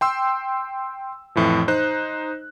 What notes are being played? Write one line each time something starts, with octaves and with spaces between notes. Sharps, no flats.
G5 C6 E6
F2 A2 E3 F3
D#4 C5 F#6